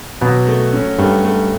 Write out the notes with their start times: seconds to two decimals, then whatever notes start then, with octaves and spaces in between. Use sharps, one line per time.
0.21 B2 F#3
0.47 A3
0.73 C#4
0.99 G2 A3
1.24 A3